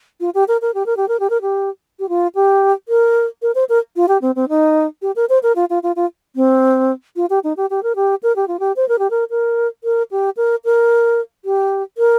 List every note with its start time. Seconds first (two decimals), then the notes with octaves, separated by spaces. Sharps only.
0.20 F4
0.35 G4
0.48 A#4
0.62 A#4
0.74 G4
0.86 A#4
0.97 G4
1.08 A#4
1.20 G4
1.30 A#4
1.42 G4
1.99 G4
2.09 F4
2.35 G4
2.89 A#4
3.42 A#4
3.55 C5
3.69 A#4
3.96 F4
4.08 G4
4.22 C4
4.36 C4
4.49 D#4
5.02 G4
5.16 A#4
5.29 C5
5.43 A#4
5.56 F4
5.70 F4
5.83 F4
5.96 F4
6.36 C4
7.16 F4
7.30 G4
7.44 D#4
7.57 G4
7.70 G4
7.83 A#4
7.96 G4
8.23 A#4
8.36 G4
8.48 F4
8.60 G4
8.76 C5
8.89 A#4
8.99 G4
9.10 A#4
9.30 A#4
9.84 A#4
10.11 G4
10.37 A#4
10.65 A#4
11.45 G4
11.98 A#4